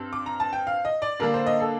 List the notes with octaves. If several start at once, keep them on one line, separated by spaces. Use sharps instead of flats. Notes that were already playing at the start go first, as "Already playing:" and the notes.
Already playing: G2 C4
D6
A#5
A5
G5
F5
D#5
D5
D3 G3 A#3 D4 A#4
C5
D#5
A4